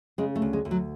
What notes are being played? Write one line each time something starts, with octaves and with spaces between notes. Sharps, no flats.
C#3 G#3
A3
D2
G#3
D2
F#3